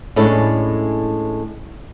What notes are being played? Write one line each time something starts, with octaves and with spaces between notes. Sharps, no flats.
A2 G#3 C#4 D4 E4 A4